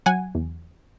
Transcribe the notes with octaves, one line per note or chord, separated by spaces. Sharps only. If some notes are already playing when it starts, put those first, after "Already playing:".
F#3 F#5 G#5
E2